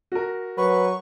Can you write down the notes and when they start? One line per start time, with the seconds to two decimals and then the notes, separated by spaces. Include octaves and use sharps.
0.12 F#4 A#4
0.58 F#3 B4 C#6